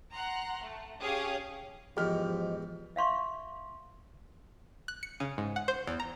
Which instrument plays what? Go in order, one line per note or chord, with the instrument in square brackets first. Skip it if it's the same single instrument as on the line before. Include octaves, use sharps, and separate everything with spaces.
[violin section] F#5 A#5 C6 F#6
A3
C#4 G4 G#4 C#5 F5 D#6
[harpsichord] E2 G#2 [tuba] F3 [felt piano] G4 F6 [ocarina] D#5
[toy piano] E5 F5 C6 C#6
[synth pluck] F#6
C#7
C#3
G#2
F#5
C5
E2
A#5